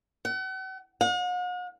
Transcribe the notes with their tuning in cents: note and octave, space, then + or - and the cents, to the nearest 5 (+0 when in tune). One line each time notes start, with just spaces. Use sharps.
F#5 +40
F#5 -45